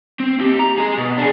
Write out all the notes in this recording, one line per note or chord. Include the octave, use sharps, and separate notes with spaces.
C4
D#2 G4
A#5
G#4 D#5
B2
D4 G#4